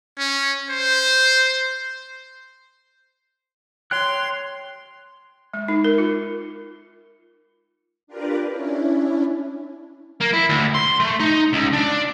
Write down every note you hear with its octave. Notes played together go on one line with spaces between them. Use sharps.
C#4
C5
C#5 G5 C6 F#6
G#3
D#4
A#4
F4
D4 F4 G4 A#4 B4 D5
C#4 D4 E4
A#3
E4
D2
C6
A3
D#4
C#2
D4